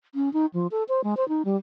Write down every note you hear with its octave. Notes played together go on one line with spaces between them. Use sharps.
C#4
D#4
F3
A4
C5
G#3
C5
D#4
G3